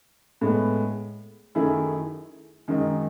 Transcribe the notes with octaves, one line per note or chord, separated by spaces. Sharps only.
A2 G#3 B3
F#2 D#3 A3 E4 G#4
F#2 D#3 G#3 D#4